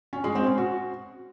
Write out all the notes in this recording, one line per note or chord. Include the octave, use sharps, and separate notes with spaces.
C#4
G#3
C4
C#4
F#4